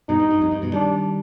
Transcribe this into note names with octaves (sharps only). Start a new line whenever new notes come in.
G2 B2 D#4
G2
G2
F2
G2
G2 B2
D#3 G3 D4